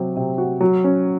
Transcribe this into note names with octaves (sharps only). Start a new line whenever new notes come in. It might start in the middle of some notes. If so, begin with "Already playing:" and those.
Already playing: C3 F#3 C4
C3
F#4
F#3
C#4